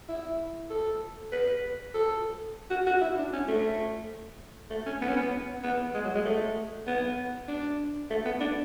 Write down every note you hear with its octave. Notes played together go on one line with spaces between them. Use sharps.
E4
A4
B4
A4
F#4
F#4
E4
D4
C#4
A3
A3
C#4
B3
C#4
B3
B3
G#3
F#3
G#3
A3
B3
D4
A3
B3
D4